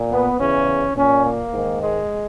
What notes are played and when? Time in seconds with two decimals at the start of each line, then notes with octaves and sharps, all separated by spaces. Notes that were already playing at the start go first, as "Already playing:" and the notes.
Already playing: A#2
0.11 B3
0.39 E2 C#3 E3 C#4
0.96 A#2 C#4
1.24 A#3
1.53 G#2 D#3
1.81 G#3